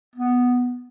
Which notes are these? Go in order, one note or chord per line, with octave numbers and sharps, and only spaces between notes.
B3